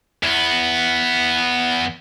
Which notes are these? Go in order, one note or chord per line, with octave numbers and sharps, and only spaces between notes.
E2 B3